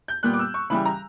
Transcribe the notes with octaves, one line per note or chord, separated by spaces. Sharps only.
G6
A#2 G3 B3 F#6
D6
E6
C#6
C#3 E3 G3 B5
A#5